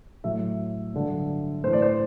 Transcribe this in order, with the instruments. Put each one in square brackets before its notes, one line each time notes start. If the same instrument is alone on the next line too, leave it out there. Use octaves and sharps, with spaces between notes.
[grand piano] A2 F#3 E5
G2 D3 F#3
A2 C5
E3 D5
C5